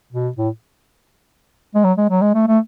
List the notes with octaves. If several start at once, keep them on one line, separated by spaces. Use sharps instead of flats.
B2
A2
G#3
F#3
G#3
F#3
G#3
A3
A3